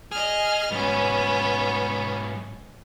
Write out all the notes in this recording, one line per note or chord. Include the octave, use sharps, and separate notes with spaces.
G#4 D#5 F6
G#2 F#3 B3 C#4